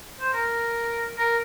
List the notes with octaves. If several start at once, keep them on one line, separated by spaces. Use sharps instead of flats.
C5
A#4
A#4